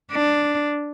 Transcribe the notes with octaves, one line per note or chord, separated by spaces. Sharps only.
D4